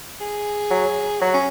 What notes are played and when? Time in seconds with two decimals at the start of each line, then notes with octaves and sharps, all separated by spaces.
0.21 G#4
0.71 F#3
1.21 F#3 F#4
1.34 C#4